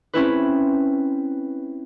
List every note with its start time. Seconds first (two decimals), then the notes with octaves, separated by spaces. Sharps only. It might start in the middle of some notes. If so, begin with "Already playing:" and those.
0.13 C4 C#4 E4 B4